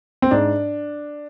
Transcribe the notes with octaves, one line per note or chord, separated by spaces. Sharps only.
C4
G#2 D4